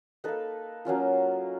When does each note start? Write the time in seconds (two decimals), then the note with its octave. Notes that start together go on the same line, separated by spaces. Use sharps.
0.24 A#3 D#4 A4 B4
0.85 F#3 A#3 C#4 F4